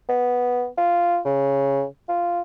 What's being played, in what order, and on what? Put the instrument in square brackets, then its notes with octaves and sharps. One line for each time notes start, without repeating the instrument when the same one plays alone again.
[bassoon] B3
F4
C#3
F4